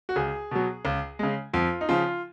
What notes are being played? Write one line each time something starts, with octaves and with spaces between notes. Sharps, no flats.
F#4
C#2 G#4
B2 F#3
C#2
C#3 G#3
F2 F4
D#4
C#3 F3 F4